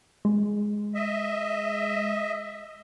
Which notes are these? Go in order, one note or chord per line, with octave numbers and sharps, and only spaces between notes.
G#3
D#5 E5